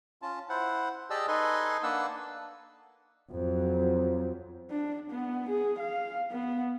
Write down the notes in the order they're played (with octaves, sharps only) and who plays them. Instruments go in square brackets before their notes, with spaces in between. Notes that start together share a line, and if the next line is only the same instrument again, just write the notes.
[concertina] C#4 F4 A5
E4 C5 F#5
G4 G#4 D5 D#5 A5 E6
D#4 A4 B4 D#5 G#5 C6
A#3 D4 B4 F#5 A5 E6
[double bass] F2 F#3
[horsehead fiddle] D4
B3
G#4
F5
B3